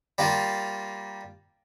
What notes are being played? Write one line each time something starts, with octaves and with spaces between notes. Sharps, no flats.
G3 A#3 F4